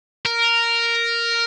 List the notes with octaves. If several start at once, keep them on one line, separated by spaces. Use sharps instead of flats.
A#4